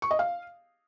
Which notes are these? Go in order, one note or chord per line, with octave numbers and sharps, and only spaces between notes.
C#6
D#5
F5